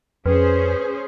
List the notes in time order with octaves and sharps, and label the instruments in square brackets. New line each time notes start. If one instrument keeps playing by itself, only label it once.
[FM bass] F2 [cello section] C#4 G#4 C5 [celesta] B4